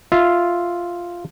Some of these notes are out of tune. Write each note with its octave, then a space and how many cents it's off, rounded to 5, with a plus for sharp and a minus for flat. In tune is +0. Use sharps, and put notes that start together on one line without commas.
F4 +0 E5 +0